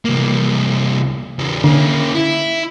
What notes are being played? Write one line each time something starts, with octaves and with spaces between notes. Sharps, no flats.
C2 A#3
E2 C#3
D3 A#3 C#4
E4